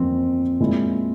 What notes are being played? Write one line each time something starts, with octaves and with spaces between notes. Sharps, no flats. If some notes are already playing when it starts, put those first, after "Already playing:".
Already playing: G1 F2 E3 A#3 C4 C#4
A#2 G#3 E4